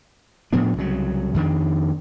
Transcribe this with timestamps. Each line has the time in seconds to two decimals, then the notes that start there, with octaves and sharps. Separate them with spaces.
0.53 A2 F3 B3 D4
0.77 C2 C#3 F#3
1.34 F2 D#3 D4